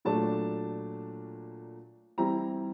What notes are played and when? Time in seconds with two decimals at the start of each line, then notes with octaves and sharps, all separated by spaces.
0.05 A#2 F#3 A3 D4 A5
2.18 E3 G3 C4 E4 A#5